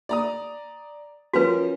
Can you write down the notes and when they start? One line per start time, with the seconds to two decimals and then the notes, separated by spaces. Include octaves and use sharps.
0.09 D5 A#5 D#6
1.34 F3 C#4 F#4 A#4 B4